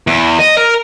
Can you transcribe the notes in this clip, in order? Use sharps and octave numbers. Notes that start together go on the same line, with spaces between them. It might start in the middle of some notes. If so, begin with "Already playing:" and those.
E2
D#5
A#4